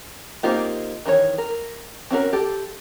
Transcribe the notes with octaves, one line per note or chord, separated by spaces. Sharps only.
A#3 C4 D#4 F4 G4
D#3 E3 F4 C#5
A#4
C4 C#4 F#4 A#4
G4 A4